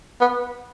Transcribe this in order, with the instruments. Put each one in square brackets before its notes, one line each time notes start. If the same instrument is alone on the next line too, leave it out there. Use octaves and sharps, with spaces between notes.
[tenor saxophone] B3